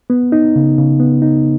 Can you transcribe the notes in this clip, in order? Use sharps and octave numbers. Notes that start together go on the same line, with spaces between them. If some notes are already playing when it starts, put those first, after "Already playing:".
B3
D#4
C#3
C#3
B3
D#4